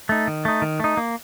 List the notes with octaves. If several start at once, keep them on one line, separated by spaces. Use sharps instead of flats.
A3 D#4
D#3
A3 D#4
D#3
A3 D#4
A#3